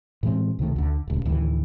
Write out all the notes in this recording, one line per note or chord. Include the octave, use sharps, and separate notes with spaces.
A2 E3 G#3 C4
C#2 C3 D#3 A3
D2 D3
D#1 C#2
D2 A2 D#3 E3